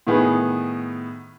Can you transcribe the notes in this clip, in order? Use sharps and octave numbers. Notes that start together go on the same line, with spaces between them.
A2 D#3 B3 G#4